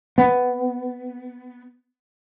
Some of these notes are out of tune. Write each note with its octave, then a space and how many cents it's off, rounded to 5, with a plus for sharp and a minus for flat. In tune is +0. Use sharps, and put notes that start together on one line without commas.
B3 +10